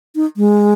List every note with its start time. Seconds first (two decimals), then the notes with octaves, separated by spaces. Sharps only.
0.15 D#4
0.37 G#3